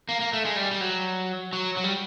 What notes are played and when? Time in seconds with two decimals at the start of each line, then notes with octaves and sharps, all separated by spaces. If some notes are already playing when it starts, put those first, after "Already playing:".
0.09 A#3
0.20 A#3
0.33 A3
0.45 G#3
0.56 G3
0.71 G3
0.81 F#3
1.53 F#3
1.77 F#3
1.84 G3